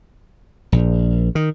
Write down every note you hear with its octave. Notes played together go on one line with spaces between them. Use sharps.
A#1
D#3